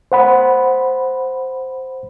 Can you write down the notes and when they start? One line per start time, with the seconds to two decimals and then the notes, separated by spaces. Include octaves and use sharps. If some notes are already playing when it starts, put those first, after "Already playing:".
0.12 C5 F#5 B5